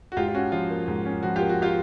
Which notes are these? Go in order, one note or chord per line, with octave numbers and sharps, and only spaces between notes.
F#4
G#2 F4 G4
F4
C#4 F#4
F3 F4
A#3
G#2
C#4
F3 F#4
A#3 F4 G4
F#4
F4 G4